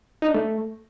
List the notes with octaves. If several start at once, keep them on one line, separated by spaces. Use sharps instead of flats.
D#4
D4
A3